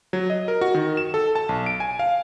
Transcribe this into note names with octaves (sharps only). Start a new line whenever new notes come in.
F#3
D#5
A#4
F#4
D#3
E7
A4
A5
B1
D7
G#5
F5